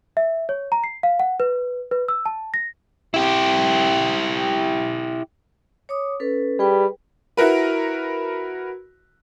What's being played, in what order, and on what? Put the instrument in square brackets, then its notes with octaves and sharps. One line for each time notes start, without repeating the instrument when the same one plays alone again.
[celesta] E5
C#5
A#5
C7
F5
F#5
B4
B4
E6
A5
A#6
[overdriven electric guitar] E4 G4
[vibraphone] C#5 D6 D#6
C#4 A4 B4
[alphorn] G3 [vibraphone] G#4 B4 G5
[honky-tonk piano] E4 F#4 A#4 B4